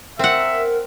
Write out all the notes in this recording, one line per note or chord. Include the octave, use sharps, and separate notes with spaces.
C4 A#4 E5 F#5